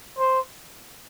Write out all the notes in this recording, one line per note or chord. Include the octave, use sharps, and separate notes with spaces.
C5